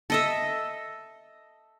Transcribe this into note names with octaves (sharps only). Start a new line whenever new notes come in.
A4 D#5 E5